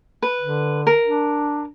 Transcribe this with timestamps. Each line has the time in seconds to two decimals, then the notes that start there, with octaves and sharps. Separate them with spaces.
0.22 B4
0.41 D3
0.87 A#4
1.05 D4